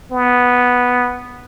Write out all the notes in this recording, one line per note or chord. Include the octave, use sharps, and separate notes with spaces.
B3